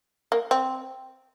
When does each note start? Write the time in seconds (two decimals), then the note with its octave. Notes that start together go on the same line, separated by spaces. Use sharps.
0.32 A#3
0.51 C4